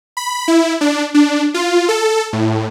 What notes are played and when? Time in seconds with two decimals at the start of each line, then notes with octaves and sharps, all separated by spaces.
0.17 B5
0.48 E4
0.81 D4
1.14 D4
1.54 F4
1.89 A4
2.33 A2